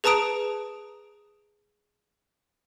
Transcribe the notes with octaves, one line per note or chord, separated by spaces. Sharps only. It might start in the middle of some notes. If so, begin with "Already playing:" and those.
G#4 B4 A5 A#5 D#6 D7